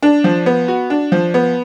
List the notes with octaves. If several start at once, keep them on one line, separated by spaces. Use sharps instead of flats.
D4
F3
B3
F#4
D4
F3
B3